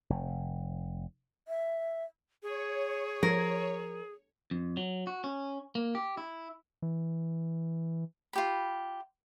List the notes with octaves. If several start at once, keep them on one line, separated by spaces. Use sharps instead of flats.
F1
E5
G#4 C#5
F3 A#4
F2
F#3
F#4
C#4
A#3
G4
E4
E3
F4 G4 B5